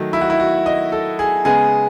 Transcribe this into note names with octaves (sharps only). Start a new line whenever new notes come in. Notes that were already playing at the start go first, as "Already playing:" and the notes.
Already playing: D#3 F#3 A3
E4
F#4
E4
F#4
D#5
A4
G#4
C#3 G#3 B3 G#4